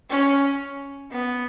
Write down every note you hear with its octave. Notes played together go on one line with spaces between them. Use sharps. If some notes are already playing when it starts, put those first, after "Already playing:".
C#4
B3